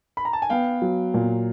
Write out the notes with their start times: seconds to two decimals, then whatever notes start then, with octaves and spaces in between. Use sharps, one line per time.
0.17 B5
0.25 A#5
0.33 A5
0.42 G#5
0.50 B3 F5 G5
0.82 F#3
1.14 A#2